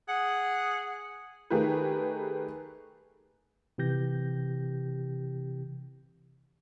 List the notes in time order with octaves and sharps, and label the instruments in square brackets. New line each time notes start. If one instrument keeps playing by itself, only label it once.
[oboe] G#4 [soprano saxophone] F#5
[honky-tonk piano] D#3 A3 G4 G#4 A#4 B4
[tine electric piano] C3 E3 G4 G6 A#6